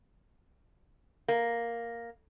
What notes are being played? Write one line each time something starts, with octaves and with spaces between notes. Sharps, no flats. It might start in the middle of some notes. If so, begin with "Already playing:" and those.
A#3